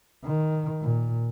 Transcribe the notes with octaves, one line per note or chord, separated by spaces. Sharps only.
D#3
A#2